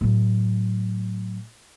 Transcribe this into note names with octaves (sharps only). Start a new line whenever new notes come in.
A2 F#3